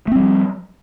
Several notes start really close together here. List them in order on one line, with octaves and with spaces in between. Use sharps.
A3 C4 G3 F3